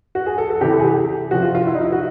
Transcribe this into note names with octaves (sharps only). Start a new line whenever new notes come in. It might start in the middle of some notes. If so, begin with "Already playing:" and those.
F#4
G#4
A4
A4
C3 E3 G4
A4
G#4
G4
C3 F3 F#4
F4
F4
E4
D#4
E4
F#4